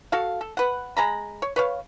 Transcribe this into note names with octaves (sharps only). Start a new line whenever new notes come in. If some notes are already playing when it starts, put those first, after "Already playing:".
F#4 A4 F5
A4
B4 F#5
G#3 A#5 B5
C#5
B4 C#5 F5